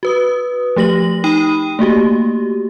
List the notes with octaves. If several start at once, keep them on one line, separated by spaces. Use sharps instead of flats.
F#4 B4 D#6
F3 A3 G4 A#6 F#7
D#4 G5 B5 D#6 D#7
A3 A#3 F#4 G4